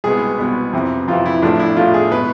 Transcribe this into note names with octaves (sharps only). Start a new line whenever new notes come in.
C2 B2 G#3 B3 G#4
C2 B2 G#3 B3
F2 C3 E3
F2 C3 E3 F4
E4
A1 A2 F3 A3 D4
E4
A1 A2 F3 A3 F4
G#4
B2 G#3 B4